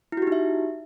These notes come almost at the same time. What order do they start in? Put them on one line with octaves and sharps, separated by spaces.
E4 F#4 G4 D#4 E5